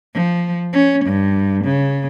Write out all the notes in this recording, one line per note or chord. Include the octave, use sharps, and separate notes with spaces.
F3
C#4
G2
C#3